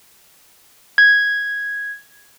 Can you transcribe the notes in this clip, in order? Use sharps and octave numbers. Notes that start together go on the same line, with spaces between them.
G#6